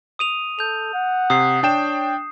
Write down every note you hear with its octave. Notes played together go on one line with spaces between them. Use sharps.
D#6 D#7 F7
A4 G6 F7
F#5
C3 D#6 C7
D4 C#5 G5 E7